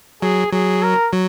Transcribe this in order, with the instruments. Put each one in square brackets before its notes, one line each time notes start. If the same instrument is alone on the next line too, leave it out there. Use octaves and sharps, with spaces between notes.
[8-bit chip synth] F#3 [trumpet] G#4
[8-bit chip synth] F#3 [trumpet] G#4
[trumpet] A#4
[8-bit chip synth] F#3